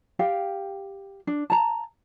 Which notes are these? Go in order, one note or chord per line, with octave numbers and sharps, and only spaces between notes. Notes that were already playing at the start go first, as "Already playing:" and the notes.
G4 F5 G5
D4
A5 A#5